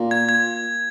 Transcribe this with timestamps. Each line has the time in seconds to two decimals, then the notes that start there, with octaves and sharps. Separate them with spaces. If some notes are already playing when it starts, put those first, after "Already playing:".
Already playing: A#2
0.11 G#6
0.29 G#6